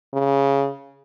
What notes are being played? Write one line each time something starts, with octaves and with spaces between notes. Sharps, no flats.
C#3